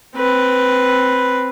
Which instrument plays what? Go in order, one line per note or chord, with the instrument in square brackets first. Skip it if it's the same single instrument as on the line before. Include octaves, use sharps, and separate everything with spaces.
[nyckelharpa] C4 B4